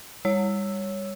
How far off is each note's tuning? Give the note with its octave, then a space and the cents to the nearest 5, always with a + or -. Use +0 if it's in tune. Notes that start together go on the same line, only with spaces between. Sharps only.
G3 +35 C#5 +0 E6 +0